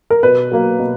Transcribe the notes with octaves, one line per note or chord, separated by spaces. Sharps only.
A#4
B2 B4
F#3 A#3
B2